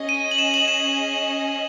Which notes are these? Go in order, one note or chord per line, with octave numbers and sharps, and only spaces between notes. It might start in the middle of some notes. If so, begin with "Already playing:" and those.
Already playing: C#4 G#4 D#5
D#7
F#7
E7
F#7
E7